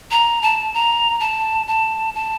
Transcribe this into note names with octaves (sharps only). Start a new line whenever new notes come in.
A#5
A5
A#5
A5
A5
A5